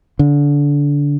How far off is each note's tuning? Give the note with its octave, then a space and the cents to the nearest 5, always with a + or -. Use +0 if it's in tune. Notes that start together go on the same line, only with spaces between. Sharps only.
D3 -25